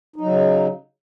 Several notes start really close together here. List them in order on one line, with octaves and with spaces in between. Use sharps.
D#4 F#3 C#3